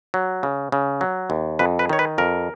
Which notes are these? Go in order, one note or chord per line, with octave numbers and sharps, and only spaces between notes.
F#3
C#3
C#3
F#3
D#2
F2 B4
B4
D#3 C#5
B4
F2 A#4